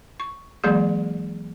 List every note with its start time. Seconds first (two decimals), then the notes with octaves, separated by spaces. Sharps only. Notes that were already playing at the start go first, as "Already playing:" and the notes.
0.20 C#6
0.64 E3 F#3 G#3 A#3 G#4